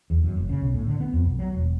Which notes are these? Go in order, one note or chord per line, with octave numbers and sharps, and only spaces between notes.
E2
F#2
F#1
C#3
B1
A2
D3
B3
F2
B1
F#3
E1